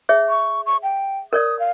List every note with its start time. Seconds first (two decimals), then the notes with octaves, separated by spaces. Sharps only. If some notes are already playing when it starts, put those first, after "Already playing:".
0.09 G#4 C#5 E5
0.29 C#6
0.66 C#6
0.83 G5
1.33 A#4 C#5 D5 D#6
1.59 F5